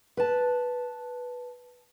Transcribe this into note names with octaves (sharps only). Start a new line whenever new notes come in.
B4 A5